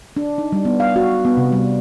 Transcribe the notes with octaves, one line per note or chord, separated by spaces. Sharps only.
D4
D#4
G3
B3
F5
F#4
B3
C3
G3